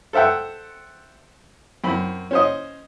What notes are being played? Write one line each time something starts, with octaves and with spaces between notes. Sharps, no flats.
A4 C5 E5 F#5 G5
F#2 C4 B5
C#4 C5 D#5